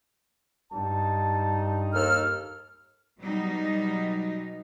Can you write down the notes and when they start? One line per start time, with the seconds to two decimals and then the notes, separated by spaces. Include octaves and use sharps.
0.72 G2 D#4 A5
1.94 D#2 A4 F6
3.20 B2 F#3 G3 D#4